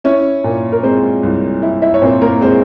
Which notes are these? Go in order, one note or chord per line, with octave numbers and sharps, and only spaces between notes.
C#4 E4 C#5
A#2
A#4
G#3 C4 C5
C2
E4
E4 E5
C#5
A#2 C4 C5
A#3 A#4
G#3 C4 C5